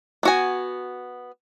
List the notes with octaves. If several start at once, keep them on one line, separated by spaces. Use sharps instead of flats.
B3 F#4 G#5